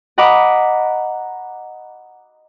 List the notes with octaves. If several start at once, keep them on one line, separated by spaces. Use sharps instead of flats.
D#5 F#5 A#5 B5 D6 D#6